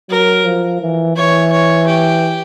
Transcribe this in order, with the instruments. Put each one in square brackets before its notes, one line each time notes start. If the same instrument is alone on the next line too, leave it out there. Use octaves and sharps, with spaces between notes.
[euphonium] F#3 [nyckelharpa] A#4
[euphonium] F3
E3
[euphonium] E3 [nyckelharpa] C#5
[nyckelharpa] C#5
G4